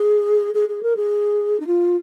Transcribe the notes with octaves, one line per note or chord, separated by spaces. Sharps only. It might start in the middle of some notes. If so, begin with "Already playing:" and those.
Already playing: G#4
G#4
G#4
A#4
G#4
D#4
F4